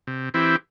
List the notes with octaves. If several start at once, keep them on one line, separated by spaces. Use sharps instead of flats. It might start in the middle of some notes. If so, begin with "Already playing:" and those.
C3
E3 C4 E4 G4